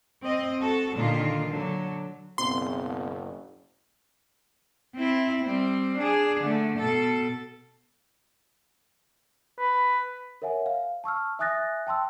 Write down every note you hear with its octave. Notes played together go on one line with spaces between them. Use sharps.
C4 D#5
F#4 A4
A#2 D3 D#3 F4
D3 F#3
F#1 B2 C4 C6
C4 E4
G3 C4
D4 G#4
D3 A3
B2 A4
B4
A#4 C#5 E5 F#5 G#5
F5
A5 C#6 E6 F6
E5 G#5 D#6 F#6 A6 A#6
G5 A5 C6 E6